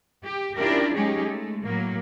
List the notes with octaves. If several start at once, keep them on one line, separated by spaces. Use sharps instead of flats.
G4
C#4 D4 E4 F4 G4 A#4
F#3 G#3 C#4 D#4 G4 G#4
G#3 A3
A2 F#3 A#3